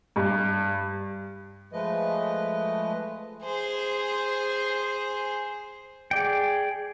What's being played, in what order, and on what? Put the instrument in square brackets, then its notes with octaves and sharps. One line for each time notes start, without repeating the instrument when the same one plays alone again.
[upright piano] G2
[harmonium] F3 G#3 A3 B4 D#5
[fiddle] G#4 C5
[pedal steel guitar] G#4 D5 G5